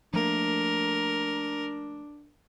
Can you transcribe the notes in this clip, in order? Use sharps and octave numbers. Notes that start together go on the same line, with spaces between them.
F3 A3 A#3 D4 A#4